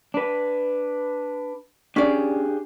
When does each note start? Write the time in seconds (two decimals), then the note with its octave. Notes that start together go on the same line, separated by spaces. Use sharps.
0.14 D4 B4
1.96 C#4 D4 G4 G#4 D5